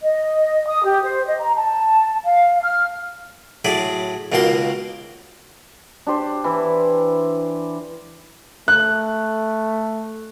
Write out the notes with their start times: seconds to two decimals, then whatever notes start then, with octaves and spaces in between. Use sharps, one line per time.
0.03 D#5
0.68 D#6
0.84 G4
1.04 C5
1.26 D#5
1.40 A#5
1.56 A5
2.24 F5
2.63 F6
3.65 A2 F#3 G#4 D5 B5
4.32 C#2 B2 D#3 A#3 F#4 C6
6.07 D4 G4 C5
6.44 E3 E4
8.68 A3 F#6